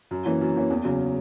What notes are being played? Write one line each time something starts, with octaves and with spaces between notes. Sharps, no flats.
F#2
E3 A#3 C#4
F#2
E3 A#3 C#4
E2
C#3 F#3